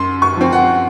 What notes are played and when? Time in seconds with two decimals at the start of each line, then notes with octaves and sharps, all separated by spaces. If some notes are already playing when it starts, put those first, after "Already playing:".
Already playing: F#2 C6
0.22 C#6
0.37 F3 C4
0.52 F#5